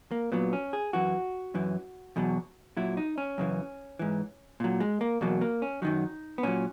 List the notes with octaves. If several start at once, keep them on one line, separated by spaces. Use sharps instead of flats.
A#3
A#2 F#3 B3
C#4
G#4
F#2 E3 F#4
F#2 E3
E2 B2 F#3
A#2 F#3 E4
D#4
C#4
F#2 C#3 E3
G#2 E3
A#2 F#3
G#3
A#3
E2 B2 F#3 A#3
A#3
C#4
F#2 D#3 F#3 D#4
B3
A#2 F#3 C#4